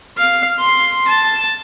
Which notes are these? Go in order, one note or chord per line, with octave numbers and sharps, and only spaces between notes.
F5
C6
A5